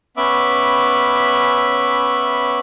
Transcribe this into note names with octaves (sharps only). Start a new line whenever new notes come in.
B3 C#4 E5 B5 D6